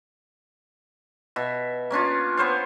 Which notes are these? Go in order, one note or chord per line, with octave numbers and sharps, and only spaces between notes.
B2 E5
A#3 C#4 D4 F4
B3 C5 C#5 F5